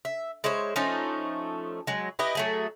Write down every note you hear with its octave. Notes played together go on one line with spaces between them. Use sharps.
E5
G#3 E4 C5 C#5
F3 A3 C#4 D#4
F#3 G#3
E4 G4 B4 D#5
F#3 A3 G#4